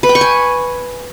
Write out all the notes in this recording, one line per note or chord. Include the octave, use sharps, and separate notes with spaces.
B4
G5
C#6
G#5